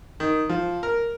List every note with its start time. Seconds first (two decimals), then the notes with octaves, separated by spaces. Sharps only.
0.20 D#3
0.49 F3
0.83 A#4